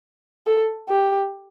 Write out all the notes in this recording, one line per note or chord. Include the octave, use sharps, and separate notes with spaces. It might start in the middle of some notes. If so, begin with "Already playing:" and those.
A4
G4